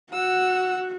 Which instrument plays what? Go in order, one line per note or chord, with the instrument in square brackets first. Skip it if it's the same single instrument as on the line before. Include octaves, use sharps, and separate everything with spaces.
[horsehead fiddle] F#4 [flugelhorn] F#5 [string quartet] E6